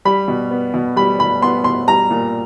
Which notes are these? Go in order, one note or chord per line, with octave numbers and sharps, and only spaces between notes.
G3 B5
B2
B3
B2
G3 B5
B2 B5
B3 C6
B2 C6
G3 A#5
A#2